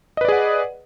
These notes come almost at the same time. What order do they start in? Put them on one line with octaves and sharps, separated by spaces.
D#5 B4 D5 G#4 F#5